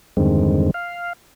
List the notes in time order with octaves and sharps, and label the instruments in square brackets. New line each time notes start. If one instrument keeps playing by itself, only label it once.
[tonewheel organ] E2 G2 D3 D#3 G#3 C4
F5